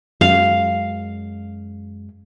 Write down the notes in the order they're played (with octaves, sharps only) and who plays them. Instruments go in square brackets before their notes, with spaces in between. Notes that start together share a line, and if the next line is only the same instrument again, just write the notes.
[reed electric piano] F#2 G#3 [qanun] F5